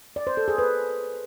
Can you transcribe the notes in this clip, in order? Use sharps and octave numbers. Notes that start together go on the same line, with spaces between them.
D5
C5
A4
G#4
B4